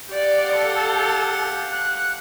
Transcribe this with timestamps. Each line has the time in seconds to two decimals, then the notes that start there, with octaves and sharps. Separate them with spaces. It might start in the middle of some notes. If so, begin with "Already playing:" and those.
0.14 G4 D5 F5 F#5
0.57 A4
1.72 F#6